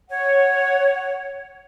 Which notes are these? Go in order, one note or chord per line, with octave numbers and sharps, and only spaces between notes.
C#5 F#5